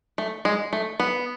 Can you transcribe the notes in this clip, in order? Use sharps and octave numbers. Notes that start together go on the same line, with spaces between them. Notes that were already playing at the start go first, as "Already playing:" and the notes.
A3
G#3
A3
B3